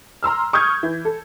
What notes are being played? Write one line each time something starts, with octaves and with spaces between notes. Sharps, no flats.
A#5 C6 E6 F6
C#6 D#6 F6 G6 G#6
E3
A4